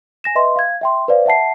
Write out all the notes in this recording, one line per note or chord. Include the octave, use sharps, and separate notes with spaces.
G#5 A#6 E7
B4 D#5 E5 C6
F5 G#6
E5 G5 C6
B4 C5 D5 F5
E5 F#5 A5 C7